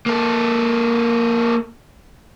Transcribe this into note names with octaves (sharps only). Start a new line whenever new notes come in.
A#3 A4